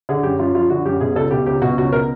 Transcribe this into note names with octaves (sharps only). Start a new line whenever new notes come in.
D3 G#4
F#2 G4
F#2 F4
F3 F4
D3 F#4
F#2 G4
B2 G#4
C#2 A4
B2 G4
C#2 G4
B2 F#4
C#2 F#4
B2 A#4